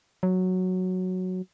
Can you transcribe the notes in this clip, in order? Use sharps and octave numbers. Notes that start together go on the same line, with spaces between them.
F#3